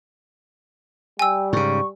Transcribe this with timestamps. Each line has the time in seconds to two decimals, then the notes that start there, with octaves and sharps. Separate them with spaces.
1.19 G3 G5 G#5 E6
1.53 G#2 C#3 C#6